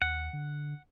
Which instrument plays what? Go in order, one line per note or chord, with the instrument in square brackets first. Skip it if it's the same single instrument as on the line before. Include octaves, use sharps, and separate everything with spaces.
[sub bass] D#2 [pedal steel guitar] F#5
[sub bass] D3